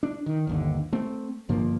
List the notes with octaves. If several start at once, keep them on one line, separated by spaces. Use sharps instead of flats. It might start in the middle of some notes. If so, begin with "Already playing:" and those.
D4
D#3
G1 D#2 D3
A3 C4
G1 G2 F3 A#3